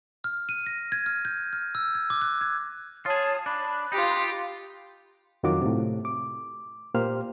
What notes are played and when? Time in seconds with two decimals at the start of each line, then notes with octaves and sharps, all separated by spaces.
0.24 F6
0.49 D#7
0.66 A#6
0.92 G#6
1.06 F6
1.25 G6
1.53 F6
1.75 E6
1.95 G#6
2.10 D6
2.22 F#6
2.41 G#6
3.06 F4 G#4 C#5 A5 D#6
3.46 D4 B5 F#6
3.92 D#4 F4 G4
5.43 F2 D#3 F#3 F4 F#4 D6
5.61 A2 C3
6.05 D6
6.94 A#2 A#3 G4 C5 F6